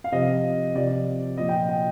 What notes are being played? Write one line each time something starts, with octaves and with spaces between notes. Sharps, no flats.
F5
C3 F3 D#5
C3 F3 D5
A#2 F3 D#5
G5
G5